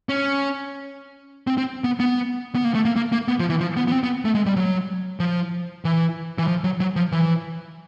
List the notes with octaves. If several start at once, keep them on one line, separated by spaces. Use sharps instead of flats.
C#4
C4
C4
B3
B3
B3
A#3
A3
A#3
A#3
A#3
B3
F3
E3
F3
B3
B3
C4
B3
A3
G#3
G3
F#3
F3
E3
E3
F3
F#3
F#3
F3
E3